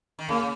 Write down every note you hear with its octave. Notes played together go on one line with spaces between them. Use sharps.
D#3
C#3 A#3